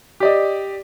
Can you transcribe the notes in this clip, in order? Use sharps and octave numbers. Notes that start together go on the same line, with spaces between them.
G4 D5 D#5